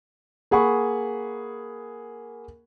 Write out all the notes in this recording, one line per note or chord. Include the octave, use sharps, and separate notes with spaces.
A#3 G#4 F#5 B5 C#6